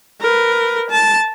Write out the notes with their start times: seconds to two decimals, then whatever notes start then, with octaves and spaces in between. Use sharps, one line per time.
0.21 A#4 B4
0.90 A5